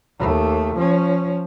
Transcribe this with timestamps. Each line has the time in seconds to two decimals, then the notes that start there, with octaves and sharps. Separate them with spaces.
0.19 D#2 A3
0.76 F3 C#4